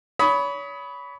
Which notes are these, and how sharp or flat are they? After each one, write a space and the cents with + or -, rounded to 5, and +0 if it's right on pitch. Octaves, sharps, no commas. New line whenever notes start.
C#5 +35 B5 +0 D#6 +25